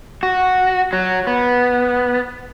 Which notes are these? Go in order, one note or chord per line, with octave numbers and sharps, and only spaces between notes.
F#4
F#3
B3